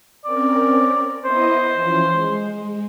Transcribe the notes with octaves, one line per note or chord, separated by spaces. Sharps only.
C4 C#4 A#4 D5
B3 E4 C5 D#5
E3 F3 C#4
G#3